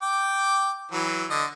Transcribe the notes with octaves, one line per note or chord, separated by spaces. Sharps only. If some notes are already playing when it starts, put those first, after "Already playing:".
G5 D6
E3 F#3
D3 D#5